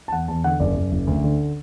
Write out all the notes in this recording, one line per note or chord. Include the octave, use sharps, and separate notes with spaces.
A5
E2 F#5
E2 A5
D3 F#5
F#1 D5
F#1
F#1
D2
D3